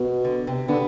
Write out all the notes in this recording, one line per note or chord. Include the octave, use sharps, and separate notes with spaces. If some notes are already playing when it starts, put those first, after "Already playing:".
Already playing: B2
D3
C3
D3 B3